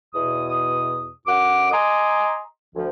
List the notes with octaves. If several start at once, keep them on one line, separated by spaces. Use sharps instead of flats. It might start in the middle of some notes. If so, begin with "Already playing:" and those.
E2 B2 D#6
F#2 F#5 D6
D#5 G#5 A#5 C6 D6 D#6
D2 F3